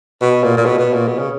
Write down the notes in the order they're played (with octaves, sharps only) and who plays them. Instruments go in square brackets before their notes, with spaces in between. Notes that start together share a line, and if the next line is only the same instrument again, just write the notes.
[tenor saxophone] B2
A#2
A#2
B2
B2
A#2
B2
C#3